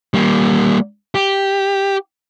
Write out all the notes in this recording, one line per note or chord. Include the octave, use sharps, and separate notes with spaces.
G3 A#3
G4